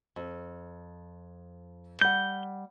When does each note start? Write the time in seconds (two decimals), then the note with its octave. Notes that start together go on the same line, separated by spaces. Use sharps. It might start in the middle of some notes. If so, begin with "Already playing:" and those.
0.16 F2
2.01 G3 F#5 G6